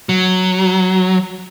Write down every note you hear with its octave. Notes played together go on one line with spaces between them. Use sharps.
F#3